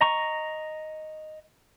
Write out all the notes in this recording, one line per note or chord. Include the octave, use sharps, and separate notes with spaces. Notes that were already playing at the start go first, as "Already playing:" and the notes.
D#5 A#5 C#6